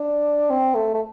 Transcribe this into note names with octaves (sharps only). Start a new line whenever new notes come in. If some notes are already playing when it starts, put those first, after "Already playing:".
Already playing: D4
C4
A3
A3